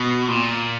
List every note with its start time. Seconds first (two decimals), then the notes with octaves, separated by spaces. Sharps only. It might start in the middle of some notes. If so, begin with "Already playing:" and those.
Already playing: B2
0.28 A#2